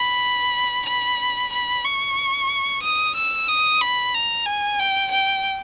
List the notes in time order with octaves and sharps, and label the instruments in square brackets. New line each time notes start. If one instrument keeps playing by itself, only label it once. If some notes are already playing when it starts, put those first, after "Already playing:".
Already playing: [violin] B5
B5
B5
C#6
D#6
E6
D#6
B5
A#5
G#5
G5
G5